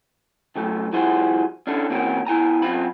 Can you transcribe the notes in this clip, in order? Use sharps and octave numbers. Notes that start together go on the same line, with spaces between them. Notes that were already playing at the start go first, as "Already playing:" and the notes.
C#3 F#3 A3
F3 G3 E4 F#4 G#4 C5
C#4 D4 E4 A4
E3 A#3 C4 C#4 F#4 A#4
B2 E4 G#5 A#5
F#2 C4 F4 B5